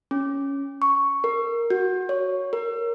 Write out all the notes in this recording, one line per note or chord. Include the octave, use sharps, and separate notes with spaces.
C#4
C#6
A#4
F#4
C#5
A#4